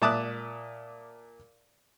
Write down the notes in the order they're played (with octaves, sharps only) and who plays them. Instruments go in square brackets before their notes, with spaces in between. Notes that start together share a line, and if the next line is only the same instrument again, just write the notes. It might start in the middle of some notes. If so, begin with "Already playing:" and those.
[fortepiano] A#2 E5 A5 D6 D#6 F#6